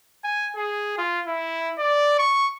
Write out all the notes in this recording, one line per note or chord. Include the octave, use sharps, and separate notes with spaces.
G#5
G#4
F4
E4
D5
C#6